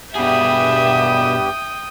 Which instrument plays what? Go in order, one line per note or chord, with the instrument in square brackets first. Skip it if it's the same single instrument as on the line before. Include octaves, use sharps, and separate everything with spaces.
[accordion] G2 B3 G4 [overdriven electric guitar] B2 G#4 [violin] E5 [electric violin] G5 D#6